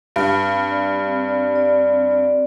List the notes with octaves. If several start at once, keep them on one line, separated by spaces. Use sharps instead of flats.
G2 G4
C4
D5
C4
D5
D5
C4
D5